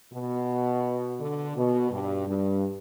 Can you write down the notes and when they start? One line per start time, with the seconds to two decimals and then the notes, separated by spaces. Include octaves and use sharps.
0.12 B2
1.19 D3
1.55 B2
1.91 G2
2.27 G2